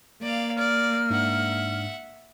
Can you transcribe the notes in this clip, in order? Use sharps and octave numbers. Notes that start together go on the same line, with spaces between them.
A#3 D5 F5
D5 F6
G#2 D4 E5 F#5